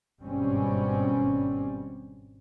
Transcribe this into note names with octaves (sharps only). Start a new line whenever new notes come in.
G#1 G2 B2 G3 C4 C#4